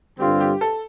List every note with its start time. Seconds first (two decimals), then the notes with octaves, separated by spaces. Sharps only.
0.19 G2 D3 G3 C4 F4 G4
0.40 G4
0.61 A4